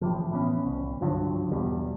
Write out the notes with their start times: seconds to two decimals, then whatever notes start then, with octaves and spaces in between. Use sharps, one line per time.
0.01 A2 E3 F3
0.31 E3 B3 C#4
0.65 C2
1.01 G2 D3 F3 F#3
1.52 E2 B2 G3